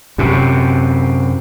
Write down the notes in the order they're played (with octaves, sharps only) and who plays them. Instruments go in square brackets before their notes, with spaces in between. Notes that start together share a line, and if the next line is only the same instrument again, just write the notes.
[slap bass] F#2 C3